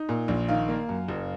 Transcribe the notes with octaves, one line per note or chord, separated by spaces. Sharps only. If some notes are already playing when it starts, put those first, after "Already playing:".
Already playing: D#4
A#2
A#1
D#3 F5
A#3
F#2
F#1